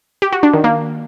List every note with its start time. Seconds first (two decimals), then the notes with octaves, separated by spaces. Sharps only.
0.22 G4
0.33 F#4
0.43 D4
0.54 D#3
0.64 A#3